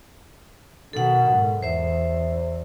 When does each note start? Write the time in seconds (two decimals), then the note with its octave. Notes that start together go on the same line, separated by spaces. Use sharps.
0.93 B2 D#3 A4 F#5
1.31 G#2
1.63 E2 C5 E5